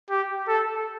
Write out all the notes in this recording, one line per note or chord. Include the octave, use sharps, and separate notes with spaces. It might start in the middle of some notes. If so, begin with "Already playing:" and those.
G4
A4